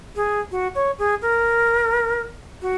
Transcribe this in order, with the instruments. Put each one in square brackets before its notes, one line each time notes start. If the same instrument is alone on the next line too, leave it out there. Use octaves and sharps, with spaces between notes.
[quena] G#4
F#4
C#5
G#4
A#4
F#4